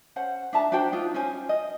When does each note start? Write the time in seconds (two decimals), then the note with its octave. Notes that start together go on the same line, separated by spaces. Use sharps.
0.16 C#4 C5 F#5
0.53 D4 E5 A5 A#5
0.72 D4 F#4 C5 G5
0.92 D4 D#4 F4
1.14 C#4 C5 G#5
1.49 D#5